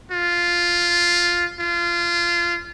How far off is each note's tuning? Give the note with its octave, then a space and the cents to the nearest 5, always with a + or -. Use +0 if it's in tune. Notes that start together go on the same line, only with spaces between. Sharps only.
F4 +0
F4 -20